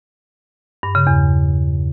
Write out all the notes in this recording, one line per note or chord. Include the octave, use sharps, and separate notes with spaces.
G2
C#3
E2